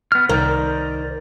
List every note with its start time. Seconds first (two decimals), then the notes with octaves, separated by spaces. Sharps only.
0.12 B3 F6
0.29 C2 D#3 A#4 C5 D5